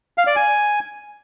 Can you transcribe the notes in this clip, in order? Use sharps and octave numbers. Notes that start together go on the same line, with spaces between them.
F5
D5
G#5